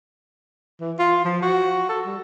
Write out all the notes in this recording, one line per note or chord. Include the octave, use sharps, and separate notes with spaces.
E3
F4
F3
F#4
A4
G3